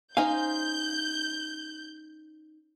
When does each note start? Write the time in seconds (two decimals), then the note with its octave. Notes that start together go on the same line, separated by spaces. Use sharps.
0.17 C#4 D#4 C5 F5 G#5 G6